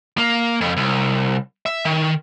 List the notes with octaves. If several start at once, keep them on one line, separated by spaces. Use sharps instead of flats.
A#3
F2
C2
E5
D#3